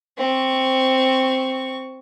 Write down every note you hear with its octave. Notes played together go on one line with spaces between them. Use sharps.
C4 C#6